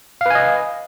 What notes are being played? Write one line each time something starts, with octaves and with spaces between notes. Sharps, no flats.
B4 D#5 F5 G#5